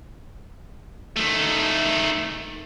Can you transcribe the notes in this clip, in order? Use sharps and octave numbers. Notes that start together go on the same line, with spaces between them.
D#3 A3